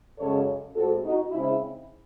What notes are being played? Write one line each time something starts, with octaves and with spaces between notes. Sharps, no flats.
F#2 C#3 G#3 A4 C#5
A2 G#3 C4 F#4 A4
D#4 F#4
C#3 G#3 C4 D#4 E4